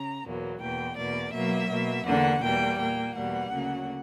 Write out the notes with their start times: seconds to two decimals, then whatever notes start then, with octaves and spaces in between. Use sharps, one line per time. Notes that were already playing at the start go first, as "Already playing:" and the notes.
Already playing: C#3 A#5
0.25 E2 B2 F#3 A#3
0.61 E2 B2 A#3 G5
0.97 E2 B2 A#3 D5
1.33 B2 F#3 A#3 E5
1.71 B2 A#3
2.06 E2 D3 A#3 F#5
2.42 E2 B2 G3 A#3 G5
2.78 A#2 A#3 G5
3.16 E2 B2 G3 A#3 F#5
3.51 D2 C#3 F#3 A#3